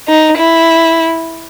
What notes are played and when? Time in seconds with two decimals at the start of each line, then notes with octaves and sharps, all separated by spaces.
0.08 D#4
0.38 E4